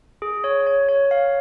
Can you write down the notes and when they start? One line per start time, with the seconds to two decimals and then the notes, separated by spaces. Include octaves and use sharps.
0.22 G#4
0.44 C#5
0.67 C#5
0.89 C#5
1.11 F5